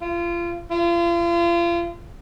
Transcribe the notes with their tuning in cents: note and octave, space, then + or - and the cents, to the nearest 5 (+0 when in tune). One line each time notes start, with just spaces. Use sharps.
F4 -30
F4 -35